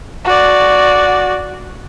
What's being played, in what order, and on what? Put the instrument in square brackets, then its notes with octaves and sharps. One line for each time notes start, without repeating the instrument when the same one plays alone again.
[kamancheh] F#4 D5